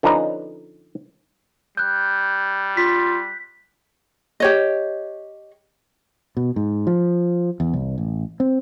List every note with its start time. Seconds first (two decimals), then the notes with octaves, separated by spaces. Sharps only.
0.03 D3 F3 C#4 D#4 B4 A#5
1.77 G3 F#6 G6
2.77 F4 B6
4.40 G4 C#5 D#5
6.37 B2
6.56 G#2
6.87 F3
7.60 E2
7.73 C2
7.98 A1
8.40 C4